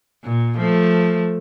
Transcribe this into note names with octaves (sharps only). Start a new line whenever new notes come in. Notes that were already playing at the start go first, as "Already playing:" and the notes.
A#2
F3 A3